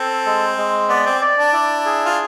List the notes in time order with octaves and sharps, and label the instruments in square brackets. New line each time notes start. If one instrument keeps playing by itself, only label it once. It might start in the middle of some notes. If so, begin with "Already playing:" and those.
Already playing: [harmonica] C4 [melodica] A4
[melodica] G#3
G#3
[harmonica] B3 [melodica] D5
[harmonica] C4
[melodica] D5
[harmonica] D4
[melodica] E4
G#4
[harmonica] F4